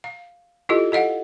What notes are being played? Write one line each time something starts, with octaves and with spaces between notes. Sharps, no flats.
F5
E4 F4 G4 A4 D#5
A4 D#5 F5 F#5